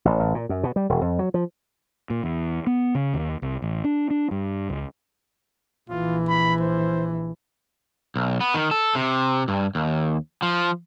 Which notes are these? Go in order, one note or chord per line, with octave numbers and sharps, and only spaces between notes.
A1
A1
A#2
F#2
B2
G3
E1
F2
F#3
F3
A#2
E2
B3
C#3
D#2
C2
A1
D4
D4
G2
C#2
A#1 E3 F4
B5
C5
B1
B3
D#3
A4
C3
G2
D#2
F3